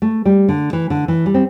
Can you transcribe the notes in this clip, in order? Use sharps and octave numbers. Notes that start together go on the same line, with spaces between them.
A3
G3
D3
E3
D3
E3
G3
C4